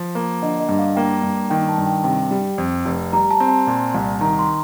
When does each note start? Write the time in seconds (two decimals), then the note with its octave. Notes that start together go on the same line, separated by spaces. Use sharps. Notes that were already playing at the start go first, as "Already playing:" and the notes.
Already playing: F3
0.15 A#3
0.42 D3 D#5
0.60 D#5
0.69 G2
0.79 F5
0.96 A#3 G5
1.23 G2
1.50 D#3 G5
1.69 A5
1.78 G2
1.87 G5
2.04 C3 G5
2.31 G3
2.58 F2
2.85 F1
3.13 G3 A#5
3.31 A5
3.40 C4
3.48 A5
3.67 A#2
3.94 C2
4.21 D#3 A#5
4.39 C6